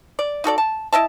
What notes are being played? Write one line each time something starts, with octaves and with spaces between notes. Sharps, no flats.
D5
D#4 F#4 A4 D5
A5
E4 D#5 E5 A5